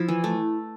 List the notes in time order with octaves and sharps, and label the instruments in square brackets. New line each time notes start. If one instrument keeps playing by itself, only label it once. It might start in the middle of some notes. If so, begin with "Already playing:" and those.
Already playing: [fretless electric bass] F3 [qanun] E4
[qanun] E3
A3